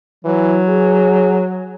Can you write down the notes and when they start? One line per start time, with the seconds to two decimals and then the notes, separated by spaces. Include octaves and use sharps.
0.25 E3 F#3
0.69 G#4